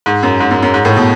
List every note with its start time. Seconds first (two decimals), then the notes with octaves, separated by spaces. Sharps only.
0.06 G#2
0.23 F#2
0.40 G#2
0.51 F#2
0.63 F#2
0.74 G#2
0.85 A2
0.96 B2